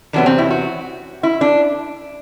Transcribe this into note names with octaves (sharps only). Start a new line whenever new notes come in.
E2 C3 F#3 B3 D4
C4
E4
F#4
E4
D4